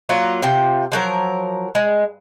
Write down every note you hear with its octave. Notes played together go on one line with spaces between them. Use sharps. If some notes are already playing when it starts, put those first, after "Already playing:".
F#3 A#3 F4
C3 F4 G5
F3 F#3 A#4
G#3